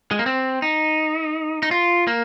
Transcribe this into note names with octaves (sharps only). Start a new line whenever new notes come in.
G#3
A#3
C4
D#4
D#4
F4
A#3